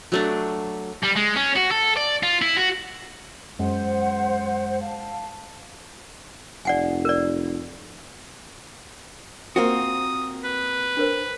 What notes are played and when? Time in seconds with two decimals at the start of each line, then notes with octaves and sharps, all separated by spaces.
0.12 F#3 A3 D4
1.04 G3
1.17 G#3
1.37 C#4
1.57 F#4
1.72 A4
1.97 D5
2.23 F4
2.42 E4
2.57 F#4
3.59 F#2 G#3 C5 F#5
4.81 F5 A5
6.65 F1 D5 F#5 G#5
7.05 A#4 D5
9.56 A#3 C4 F4 F#4 D#6
10.44 B4
10.97 D4 A#4 C5